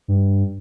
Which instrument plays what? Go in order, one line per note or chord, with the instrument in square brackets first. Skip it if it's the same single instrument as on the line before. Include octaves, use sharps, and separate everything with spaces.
[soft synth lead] G2